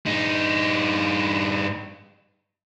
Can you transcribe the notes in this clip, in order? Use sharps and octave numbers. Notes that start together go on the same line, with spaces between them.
G2 D#4